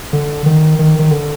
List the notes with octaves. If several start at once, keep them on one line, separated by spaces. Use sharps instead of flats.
D3
D#3
D#3
D#3
D3